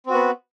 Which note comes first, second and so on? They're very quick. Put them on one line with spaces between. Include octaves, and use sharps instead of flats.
C4 F#4 B3